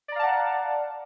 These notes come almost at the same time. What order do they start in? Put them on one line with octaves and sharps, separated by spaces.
D5 A#5 F5 A5 F#5